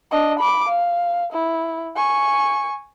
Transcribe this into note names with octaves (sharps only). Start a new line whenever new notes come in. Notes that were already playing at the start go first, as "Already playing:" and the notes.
D4 D#5
B5 D6
F5
E4
G#5 C#6